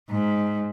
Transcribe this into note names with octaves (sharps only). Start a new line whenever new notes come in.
G#2